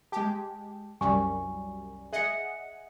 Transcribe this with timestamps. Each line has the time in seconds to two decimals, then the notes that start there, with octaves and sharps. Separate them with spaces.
0.12 G#3 G4 A5
1.01 C2 F#2 G3 G#5 C#6
2.13 G#4 D#5 E5 F#5 C#7